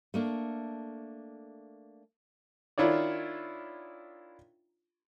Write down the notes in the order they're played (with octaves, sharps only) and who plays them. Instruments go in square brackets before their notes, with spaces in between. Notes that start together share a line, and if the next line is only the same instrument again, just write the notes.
[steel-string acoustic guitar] A3 A#3 D4
[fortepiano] D#3 D4 E4 F4 C#5 D5